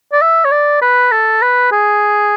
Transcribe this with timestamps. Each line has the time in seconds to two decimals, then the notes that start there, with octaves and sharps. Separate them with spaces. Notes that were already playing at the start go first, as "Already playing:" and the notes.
0.13 D5
0.22 E5
0.45 C#5
0.51 D5
0.82 B4
1.12 A4
1.42 B4
1.72 G#4